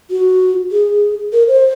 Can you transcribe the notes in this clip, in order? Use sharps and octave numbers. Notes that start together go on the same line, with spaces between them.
F#4
G#4
A#4
C5